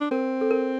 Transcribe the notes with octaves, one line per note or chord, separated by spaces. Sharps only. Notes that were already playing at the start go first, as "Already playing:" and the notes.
D4
C4 A#4
A4
A#4